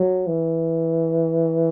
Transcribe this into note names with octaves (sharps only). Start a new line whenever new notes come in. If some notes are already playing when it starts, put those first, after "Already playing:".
Already playing: F#3
E3